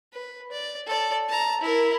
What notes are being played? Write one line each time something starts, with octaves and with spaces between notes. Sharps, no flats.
B4
D5
A4 D5
A5 A#5
E4 A#4